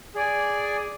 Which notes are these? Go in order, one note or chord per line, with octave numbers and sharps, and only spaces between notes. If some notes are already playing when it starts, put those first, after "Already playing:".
G#4 D5 G#5